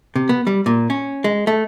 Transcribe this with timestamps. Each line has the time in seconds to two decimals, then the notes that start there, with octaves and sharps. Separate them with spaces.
0.16 C3
0.29 B3
0.47 G3
0.66 A#2
0.90 C#4
1.24 G#3
1.47 A3